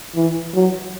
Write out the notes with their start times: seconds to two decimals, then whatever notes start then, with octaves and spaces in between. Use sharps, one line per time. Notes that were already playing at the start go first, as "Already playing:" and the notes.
0.15 E3
0.54 F#3